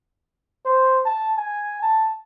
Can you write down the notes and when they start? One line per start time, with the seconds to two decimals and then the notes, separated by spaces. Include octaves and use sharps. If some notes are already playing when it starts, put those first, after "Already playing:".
0.65 C5
1.05 A5
1.38 G#5
1.82 A5